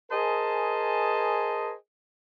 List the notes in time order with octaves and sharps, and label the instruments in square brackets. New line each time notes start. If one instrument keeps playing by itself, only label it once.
[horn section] G#4 A#4 C5 D#5 G#5 A5